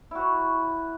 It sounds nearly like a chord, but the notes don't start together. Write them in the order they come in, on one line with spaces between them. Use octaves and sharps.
E4 F#4 C#5